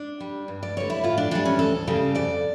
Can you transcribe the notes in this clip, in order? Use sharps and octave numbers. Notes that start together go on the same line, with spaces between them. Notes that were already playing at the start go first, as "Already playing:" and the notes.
Already playing: D4
G3
G2
D5
D3 G3 C#5
E4
A2 F4
D4
E3 G3 D4
C#4
D2 A4
C#3 G3
F2 D5